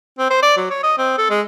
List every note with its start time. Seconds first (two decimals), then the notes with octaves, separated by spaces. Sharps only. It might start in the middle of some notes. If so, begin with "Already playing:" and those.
0.19 C4
0.31 C5
0.43 D5
0.57 F#3
0.71 C#5
0.83 D#5
0.99 C4
1.18 A4
1.30 G#3